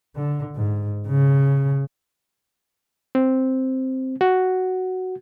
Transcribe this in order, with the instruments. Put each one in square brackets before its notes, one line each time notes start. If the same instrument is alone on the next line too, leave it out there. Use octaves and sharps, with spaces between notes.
[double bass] D3
G#2
C#3
[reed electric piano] C4
F#4